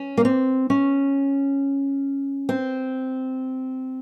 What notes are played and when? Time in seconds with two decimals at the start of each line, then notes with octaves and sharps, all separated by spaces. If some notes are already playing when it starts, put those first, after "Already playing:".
Already playing: C#4
0.17 A#3
0.25 C4
0.70 C#4
2.49 C4